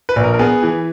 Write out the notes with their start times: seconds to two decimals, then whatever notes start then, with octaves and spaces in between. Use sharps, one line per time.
0.09 B4
0.16 A#1
0.24 A#4
0.34 A#4
0.39 B3 G#4
0.63 E3